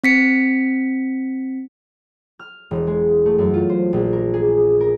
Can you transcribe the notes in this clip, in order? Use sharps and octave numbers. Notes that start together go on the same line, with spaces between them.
C4 B6 C#7
F6
E1
G#3
A3
F#2
F4
C5
A#1
A#4
G#4
A#4